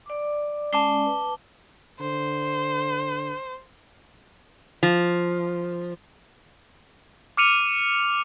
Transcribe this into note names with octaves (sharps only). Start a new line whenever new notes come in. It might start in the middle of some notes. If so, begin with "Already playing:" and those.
D5 D6
G#3 C#4 D5 A5 D6 G7
B4
D3 C5
F3
D6 F6 C#7 D#7 F7